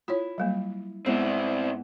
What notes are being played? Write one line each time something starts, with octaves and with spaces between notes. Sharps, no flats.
E4 F4 C#5
F#3 G3 A#3
G#2 B3 C4 E4